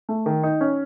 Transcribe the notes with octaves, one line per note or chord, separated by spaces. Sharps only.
A3
D#3
D#4
C#4